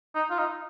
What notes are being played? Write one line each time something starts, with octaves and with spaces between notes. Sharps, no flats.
D#4
F4
D#4